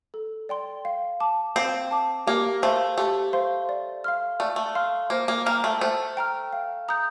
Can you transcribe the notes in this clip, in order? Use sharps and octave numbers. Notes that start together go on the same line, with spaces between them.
A4
D5 G5 C6
F5
A5 D6
C4 F5
A5 D6
A#3 G4
A3 C5 F5 C6
A3 G4
C5 F5 C6
D5
F5 C6 F6
A3 D5
A3
F5 C6 F6
A#3 C5
A#3
A#3 G5 A#5 F6
A3
A3 C5
G5 A#5 F6
F5
A#5 D#6 G6